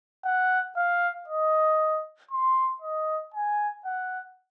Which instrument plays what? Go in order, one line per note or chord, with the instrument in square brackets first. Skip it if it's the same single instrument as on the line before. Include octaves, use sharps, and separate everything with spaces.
[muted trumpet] F#5
F5
D#5
C6
D#5
G#5
F#5